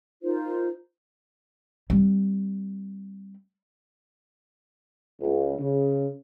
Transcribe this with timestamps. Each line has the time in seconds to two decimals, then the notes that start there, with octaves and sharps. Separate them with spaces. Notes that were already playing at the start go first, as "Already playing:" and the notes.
0.22 D#4 F4 A#4 C5
1.90 G3 C4
5.20 C#2
5.59 C#3